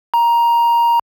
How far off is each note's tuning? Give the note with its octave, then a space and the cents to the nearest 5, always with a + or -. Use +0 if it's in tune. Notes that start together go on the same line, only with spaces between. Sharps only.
A#5 +10